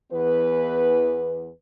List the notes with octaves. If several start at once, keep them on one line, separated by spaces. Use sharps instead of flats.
E2 E3 B3 B4